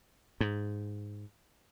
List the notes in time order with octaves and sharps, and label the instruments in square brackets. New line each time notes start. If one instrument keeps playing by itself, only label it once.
[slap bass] G#2